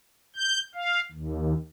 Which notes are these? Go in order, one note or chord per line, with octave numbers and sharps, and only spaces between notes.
G6
F5
D#2